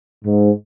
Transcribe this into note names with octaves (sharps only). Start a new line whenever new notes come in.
G#2